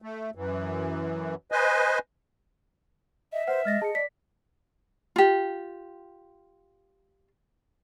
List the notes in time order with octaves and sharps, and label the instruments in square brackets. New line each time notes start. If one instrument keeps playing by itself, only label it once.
[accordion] A3
F#2 E3
B4 C5 D#5 G#5
[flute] D#5 [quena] E5
[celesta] B4 F#5 F6 [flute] C5
[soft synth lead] G#3 [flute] D#5 [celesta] F6 A6 A#6
[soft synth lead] G#4 [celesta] A5 C#7
[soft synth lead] D5 [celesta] B6
[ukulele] F4 G4